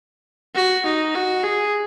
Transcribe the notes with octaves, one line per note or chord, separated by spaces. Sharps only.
F#4
D#4
F#4
G#4